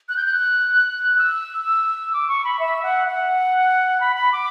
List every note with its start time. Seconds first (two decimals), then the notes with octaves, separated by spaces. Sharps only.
0.09 F#6
0.17 G6
0.25 F#6
1.18 E6
2.13 D6
2.28 C#6
2.44 B5
2.59 E5
2.83 F#5
3.08 F#5
4.01 B5
4.16 B5
4.32 D6